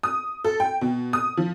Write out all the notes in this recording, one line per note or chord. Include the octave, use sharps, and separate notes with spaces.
D#6
A4
G5
B2
D#6
F3